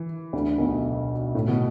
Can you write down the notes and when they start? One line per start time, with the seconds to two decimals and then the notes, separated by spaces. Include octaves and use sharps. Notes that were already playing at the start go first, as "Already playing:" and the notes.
Already playing: E3
0.33 D2 D3
0.58 B1 B2
1.35 A2
1.48 B2